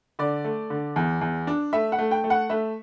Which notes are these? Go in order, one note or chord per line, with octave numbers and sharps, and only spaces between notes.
D3 D5
A3
D3
E2
E2
D4
A3 E5
F#5
A3
G5
A3
F#5
A3 E5